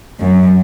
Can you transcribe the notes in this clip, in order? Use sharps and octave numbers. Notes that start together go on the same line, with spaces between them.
F#2